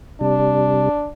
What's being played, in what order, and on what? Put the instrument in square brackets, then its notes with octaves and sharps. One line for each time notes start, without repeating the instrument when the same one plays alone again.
[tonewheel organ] C3 G3 [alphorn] D4